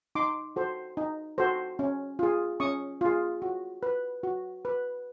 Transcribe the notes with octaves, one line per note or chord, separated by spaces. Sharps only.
D#4 C6 D6
F#4 A4 C5
D#4
F#4 A4 C5
C#4
F4 G#4
C#4 C#6 D#6
F4 G#4
F#4
B4
F#4
B4